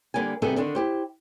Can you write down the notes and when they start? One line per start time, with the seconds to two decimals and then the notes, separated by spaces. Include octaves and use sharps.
0.14 D3 G3 A#3 B3 G#5
0.42 C3 G3 B3 D#4 G#4 A4
0.57 D3 D#3 D4
0.75 E4 G4 C5